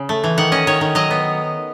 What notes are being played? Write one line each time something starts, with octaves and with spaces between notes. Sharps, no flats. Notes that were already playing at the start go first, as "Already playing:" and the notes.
Already playing: C#3
A3
E3
D#3 F#5
C#4 D#5
D#3 C#5
D#3
F#3 D#5
B3